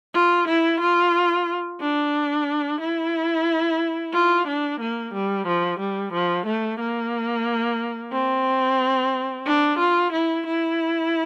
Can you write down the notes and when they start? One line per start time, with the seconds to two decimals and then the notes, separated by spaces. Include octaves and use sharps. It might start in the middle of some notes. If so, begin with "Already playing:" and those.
0.14 F4
0.48 E4
0.81 F4
1.81 D4
2.81 E4
4.13 F4
4.48 D4
4.80 A#3
5.14 G3
5.47 F3
5.80 G3
6.13 F3
6.46 A3
6.80 A#3
8.13 C4
9.46 D4
9.79 F4
10.12 E4
10.47 E4